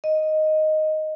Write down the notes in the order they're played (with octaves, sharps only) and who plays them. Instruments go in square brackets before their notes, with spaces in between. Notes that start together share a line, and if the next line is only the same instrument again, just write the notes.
[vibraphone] D#5